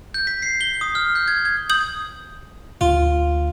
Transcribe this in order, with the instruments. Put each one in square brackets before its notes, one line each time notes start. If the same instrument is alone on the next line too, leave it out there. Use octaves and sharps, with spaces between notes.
[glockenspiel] G6
B6
C7
G7
D#6
F6
G6
G#6
G#6
[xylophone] D#6 G6 F#7
[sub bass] D2 [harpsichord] F4